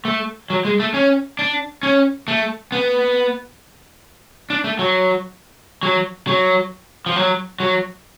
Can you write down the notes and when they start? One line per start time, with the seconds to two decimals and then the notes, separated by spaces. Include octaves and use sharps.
0.05 A3
0.50 F#3
0.65 G#3
0.80 A3
0.94 C#4
1.39 D4
1.83 C#4
2.28 A3
2.72 B3
4.50 D4
4.64 A3
4.79 F#3
5.83 F#3
6.27 F#3
7.06 F3
7.16 F#3
7.60 F#3